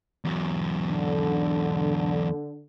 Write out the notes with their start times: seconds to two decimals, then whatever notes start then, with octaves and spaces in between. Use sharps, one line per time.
0.25 E2 F#3
0.90 D3